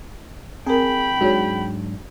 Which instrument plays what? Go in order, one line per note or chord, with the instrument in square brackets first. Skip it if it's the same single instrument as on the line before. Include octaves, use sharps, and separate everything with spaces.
[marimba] C4 A#4 [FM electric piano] G#4 [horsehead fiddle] G5 B5
[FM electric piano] G#2 F#3 D4 [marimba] F#4 G#4 C#5